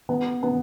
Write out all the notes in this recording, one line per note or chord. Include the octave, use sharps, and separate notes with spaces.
B3
B3